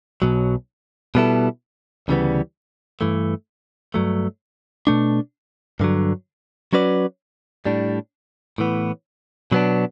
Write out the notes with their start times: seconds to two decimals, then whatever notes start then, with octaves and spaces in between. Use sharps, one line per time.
0.22 B1 B2 F#3
1.15 B2 G3 B3 E4 A4
2.08 D2 C#3 E3 G3 B3
3.01 G2 E3 A3
3.94 G2 F#3 A3
4.87 B2 A3 D4
5.80 G2 D3 F#3
6.73 F#3 C#4 F#4 B4 D5
7.65 A2 G3 D4
8.58 A2 E3 B3
9.52 B2 F#3 B3 D4